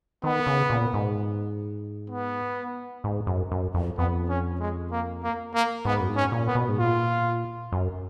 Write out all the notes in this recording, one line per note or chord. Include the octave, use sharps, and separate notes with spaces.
D#3 B3
C#3
A#2
G#2
B3
G#2
F#2
F#2
F2
F2 B3
C#4
G#3
A#3
A#3
A#3
G#2 B3
F#2
G#2
C#4
A#2
B3
B2
G#2
A#2 F4
F#2